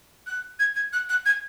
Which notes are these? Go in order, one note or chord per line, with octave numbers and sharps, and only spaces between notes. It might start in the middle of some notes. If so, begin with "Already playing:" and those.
F#6
G#6
G#6
F#6
F#6
G#6